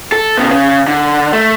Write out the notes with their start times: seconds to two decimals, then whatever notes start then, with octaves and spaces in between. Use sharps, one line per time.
0.12 A4
0.37 C#3 B3
0.50 C#3
0.88 D3
1.33 A3